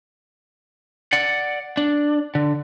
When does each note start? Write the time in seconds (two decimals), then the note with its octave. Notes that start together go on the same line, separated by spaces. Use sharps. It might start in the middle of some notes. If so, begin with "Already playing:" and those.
1.13 D5 F#5
1.77 D4
2.35 D3